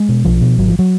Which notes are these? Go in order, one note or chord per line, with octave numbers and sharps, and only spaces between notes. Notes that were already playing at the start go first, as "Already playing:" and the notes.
Already playing: G#3
B2
B1 F3
B2
G#1 F#3
F3
F#3